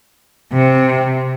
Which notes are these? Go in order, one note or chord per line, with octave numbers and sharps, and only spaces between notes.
C3